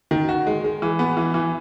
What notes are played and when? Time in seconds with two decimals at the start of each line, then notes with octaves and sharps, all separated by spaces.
0.11 D#3
0.29 F#4
0.46 G#3
0.64 G#3
0.82 E3
0.99 B3
1.17 E3
1.34 E3